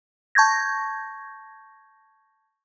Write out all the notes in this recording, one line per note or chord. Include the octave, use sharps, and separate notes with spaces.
A5 C#6 G6 G#6 A#6